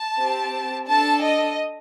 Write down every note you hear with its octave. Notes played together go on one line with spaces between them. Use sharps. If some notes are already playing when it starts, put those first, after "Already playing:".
Already playing: A5
C4 G4
D4 A4 A5
D#5